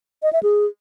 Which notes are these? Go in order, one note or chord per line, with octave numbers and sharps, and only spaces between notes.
D#5
E5
G#4